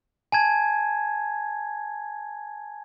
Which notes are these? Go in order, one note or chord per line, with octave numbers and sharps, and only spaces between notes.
G#5 A5 G#6